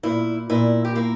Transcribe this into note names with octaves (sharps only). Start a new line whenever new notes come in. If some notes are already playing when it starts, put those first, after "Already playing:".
A#2 E4
A#2 E4
G4
A#3 E4